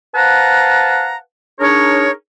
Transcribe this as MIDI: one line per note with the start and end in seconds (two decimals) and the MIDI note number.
0.15 1.17 71
0.15 1.17 72
0.15 1.17 77
0.15 1.17 78
0.15 1.17 81
0.15 1.17 82
1.60 2.10 62
1.60 2.10 63
1.60 2.10 68
1.60 2.10 70
1.60 2.10 73